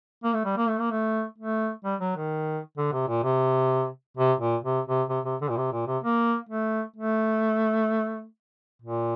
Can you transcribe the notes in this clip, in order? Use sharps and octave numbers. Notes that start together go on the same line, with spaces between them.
A#3
A3
G3
A#3
A3
A#3
A3
A3
G3
F#3
D#3
D3
C3
A#2
C3
C3
A#2
C3
C3
C3
C3
D3
A#2
C3
A#2
C3
A#3
A3
A3
A#2